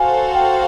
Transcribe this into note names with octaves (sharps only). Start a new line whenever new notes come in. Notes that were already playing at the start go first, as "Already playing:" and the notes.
Already playing: F#4 A4 C5 F5 G#5
G5